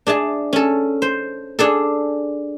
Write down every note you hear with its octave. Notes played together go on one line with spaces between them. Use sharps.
D4 G#4 E5 A5
C#4 A4
C5
D4 G#4 A4